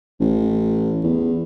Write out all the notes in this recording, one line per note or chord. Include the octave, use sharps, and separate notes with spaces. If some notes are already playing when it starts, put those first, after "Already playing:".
A1
E2